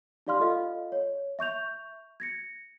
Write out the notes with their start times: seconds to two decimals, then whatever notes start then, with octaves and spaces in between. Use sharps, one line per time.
0.27 D#4 G4 D5 F5 C6 F6
0.40 F4 A4 D#5 F5
0.92 C#5
1.39 E5 C#6 G6 F7
2.20 G#6 A#6 C#7